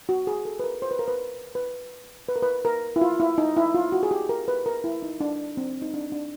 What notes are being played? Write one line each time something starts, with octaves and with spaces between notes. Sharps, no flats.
F#4
G#4
A4
B4
A#4
C5
B4
A#4
B4
B4
B4
A#4
B4
A#4
E4
F4
E4
D#4
E4
F4
F#4
G#4
G4
A#4
B4
A#4
E4
D#4
D4
C4
D#4
D4
D4